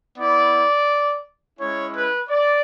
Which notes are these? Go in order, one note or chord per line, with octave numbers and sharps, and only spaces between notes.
B3 E4 D5
G#3 C#4 E4 C#5
B4
D5